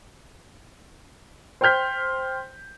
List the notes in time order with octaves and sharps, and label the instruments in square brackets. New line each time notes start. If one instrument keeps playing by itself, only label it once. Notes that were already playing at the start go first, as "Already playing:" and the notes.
[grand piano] C5 G5 C6 F6 G6 B6